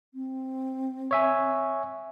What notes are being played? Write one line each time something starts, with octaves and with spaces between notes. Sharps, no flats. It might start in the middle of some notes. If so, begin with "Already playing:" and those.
C4
C#5 E5 G#5